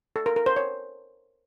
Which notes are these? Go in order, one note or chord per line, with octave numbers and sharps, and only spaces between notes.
A4
A#4
A#4
C5
C#5